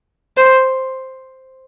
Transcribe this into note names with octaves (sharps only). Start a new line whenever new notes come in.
C5